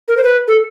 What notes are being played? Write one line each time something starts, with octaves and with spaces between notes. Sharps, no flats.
A#4
C5
B4
A4